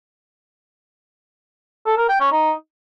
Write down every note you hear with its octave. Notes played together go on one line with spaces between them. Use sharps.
A4
A#4
G5
C#4
D#4